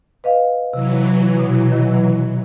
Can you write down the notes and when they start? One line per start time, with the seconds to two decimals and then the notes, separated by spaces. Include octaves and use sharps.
0.24 B4 D#5 F5
0.74 C3 E3 F#3
1.39 B2
1.72 D#3